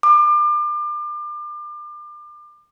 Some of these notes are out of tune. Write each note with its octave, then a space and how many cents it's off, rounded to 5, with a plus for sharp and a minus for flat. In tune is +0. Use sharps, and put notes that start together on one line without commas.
D6 +35